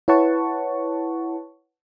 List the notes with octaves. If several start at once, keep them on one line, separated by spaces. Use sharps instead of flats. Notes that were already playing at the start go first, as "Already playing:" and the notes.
E4 B4 C#5 F#5 A5 C#6